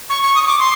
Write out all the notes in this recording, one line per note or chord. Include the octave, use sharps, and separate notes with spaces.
C#6
C#6
D#6
C#6
D6
C6